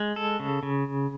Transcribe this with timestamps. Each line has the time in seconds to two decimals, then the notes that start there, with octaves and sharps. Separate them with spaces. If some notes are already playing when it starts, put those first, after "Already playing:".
Already playing: G#3
0.16 A4
0.40 C#3
0.63 C#3